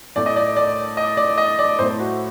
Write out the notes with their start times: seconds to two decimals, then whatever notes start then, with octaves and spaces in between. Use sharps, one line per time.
0.16 A2 A3 D5
0.26 D#5
0.36 D5
0.57 D5
0.97 D#5
1.17 D5
1.38 D#5
1.59 D5
1.79 A2 A3 C5
1.99 F#4